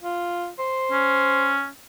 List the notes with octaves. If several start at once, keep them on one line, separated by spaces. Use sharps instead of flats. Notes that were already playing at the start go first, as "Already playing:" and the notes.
F4
C5
C#4